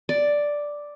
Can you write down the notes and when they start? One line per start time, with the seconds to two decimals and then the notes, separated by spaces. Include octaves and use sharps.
0.09 D5